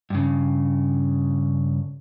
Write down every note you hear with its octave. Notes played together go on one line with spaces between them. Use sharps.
G2 C#3